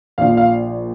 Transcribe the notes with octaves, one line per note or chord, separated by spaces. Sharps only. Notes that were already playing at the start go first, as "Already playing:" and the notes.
A#1 A#2 F3 F5
F5